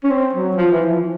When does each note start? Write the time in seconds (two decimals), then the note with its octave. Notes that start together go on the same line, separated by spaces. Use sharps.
0.04 C#4
0.11 C4
0.34 F#3
0.56 F3
0.72 E3
0.88 F3